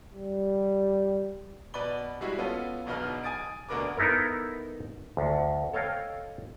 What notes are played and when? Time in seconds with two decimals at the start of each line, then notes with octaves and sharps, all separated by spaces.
0.14 G3
1.74 B2 B4 D5 B5 G7
2.21 G3 G#3 E4 F#4
2.38 B3 C#4 F4 A4
2.86 E1 B1 B2 D#4 B4 F6
3.24 G#5 D#6 A6 D7
3.69 D2 B2 D4 A#4 B4 D6
3.97 B3 D#4 E4 A4 A#4
5.17 D2
5.73 A4 C#5 D#5 F5 G5